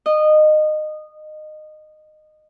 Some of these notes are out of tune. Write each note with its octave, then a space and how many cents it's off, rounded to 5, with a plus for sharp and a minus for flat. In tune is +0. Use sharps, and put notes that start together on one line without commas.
D#5 -20